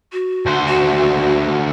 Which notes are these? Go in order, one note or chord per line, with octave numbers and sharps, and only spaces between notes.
F#4
D2 C5
F#4